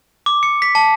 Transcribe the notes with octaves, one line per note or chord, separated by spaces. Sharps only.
D6
C#7
B6
A5